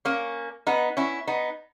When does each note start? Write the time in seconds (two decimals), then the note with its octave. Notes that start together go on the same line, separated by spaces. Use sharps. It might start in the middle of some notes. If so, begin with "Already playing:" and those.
0.05 A#3 C#4
0.67 B3 D#4
0.97 C#4 E4
1.27 B3 D#4